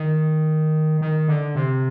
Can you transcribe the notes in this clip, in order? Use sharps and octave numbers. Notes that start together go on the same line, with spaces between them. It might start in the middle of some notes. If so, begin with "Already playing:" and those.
Already playing: D#3
D#3
D3
C3